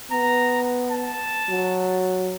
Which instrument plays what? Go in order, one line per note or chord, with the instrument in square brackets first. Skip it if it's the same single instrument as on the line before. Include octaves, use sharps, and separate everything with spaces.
[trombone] B3 [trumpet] A#5
[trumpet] A5
[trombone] F#3